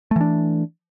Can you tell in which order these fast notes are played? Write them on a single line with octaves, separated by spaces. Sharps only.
A3 E3 D4